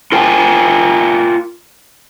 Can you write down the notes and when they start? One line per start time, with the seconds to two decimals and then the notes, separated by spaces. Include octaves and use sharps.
0.12 F4 A#4 G5 G#5